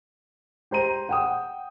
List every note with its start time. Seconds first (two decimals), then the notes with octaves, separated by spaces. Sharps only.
0.71 G4 C5 A#5 D#7
1.09 F#5 G5 D#6